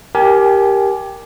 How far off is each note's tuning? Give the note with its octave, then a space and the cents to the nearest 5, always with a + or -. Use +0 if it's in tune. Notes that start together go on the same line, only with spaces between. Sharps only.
G4 +0 A#4 +0 G#5 +30